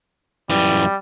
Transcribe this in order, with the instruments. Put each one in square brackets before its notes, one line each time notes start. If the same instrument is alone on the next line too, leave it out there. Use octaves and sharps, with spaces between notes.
[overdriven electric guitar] F#2 E3 [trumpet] G3